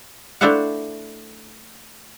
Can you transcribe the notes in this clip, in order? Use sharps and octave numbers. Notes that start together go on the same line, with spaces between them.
A3 D4 E4 C5 F5 F#5